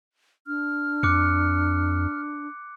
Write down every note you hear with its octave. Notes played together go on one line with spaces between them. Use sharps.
D4 F6
F2 D6 F#6 C#7